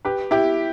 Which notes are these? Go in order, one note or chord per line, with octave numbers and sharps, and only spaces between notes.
G4 B4
E4 G4